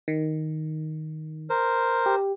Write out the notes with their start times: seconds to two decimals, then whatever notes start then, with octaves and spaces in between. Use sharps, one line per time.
0.08 D#3
1.50 A#4 C5
2.06 G4